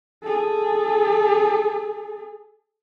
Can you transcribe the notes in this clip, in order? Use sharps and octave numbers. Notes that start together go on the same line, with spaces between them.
G#4 A4